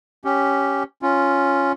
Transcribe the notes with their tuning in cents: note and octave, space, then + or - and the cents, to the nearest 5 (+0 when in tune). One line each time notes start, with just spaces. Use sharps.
C#4 +0 G4 -5
C#4 +0 F4 +0